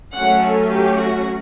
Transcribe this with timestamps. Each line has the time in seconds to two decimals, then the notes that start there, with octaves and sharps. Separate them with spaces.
0.14 F#3 A3 C#4 F#5
0.41 A4
0.71 G4
0.98 F#4